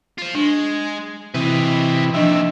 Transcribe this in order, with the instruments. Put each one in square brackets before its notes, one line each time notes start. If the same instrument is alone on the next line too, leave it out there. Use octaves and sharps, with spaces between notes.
[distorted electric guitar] F4 C5
[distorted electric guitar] G#3 [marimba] D4
[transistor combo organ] C3 E3 [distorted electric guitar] B4 D#5
[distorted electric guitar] D#2 C3 [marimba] F3 D4 D#5 [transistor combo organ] E5